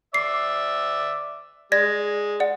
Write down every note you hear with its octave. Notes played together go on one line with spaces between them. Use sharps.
D5 E5 C7
G#3 D5 G#6 A#6
D5 F#5